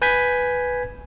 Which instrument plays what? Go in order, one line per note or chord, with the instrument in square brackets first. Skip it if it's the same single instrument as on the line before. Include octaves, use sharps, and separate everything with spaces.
[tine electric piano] B4 G#5 G6 G#6 B6